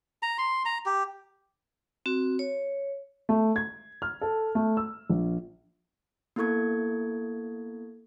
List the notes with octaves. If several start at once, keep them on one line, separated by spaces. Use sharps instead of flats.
A#5
C6
A#5
G4
C4 F#4
C#5
A3
G#6
F6
A4
A3
E6
A#1
A#3 B3 E4 A4 C#6 G#6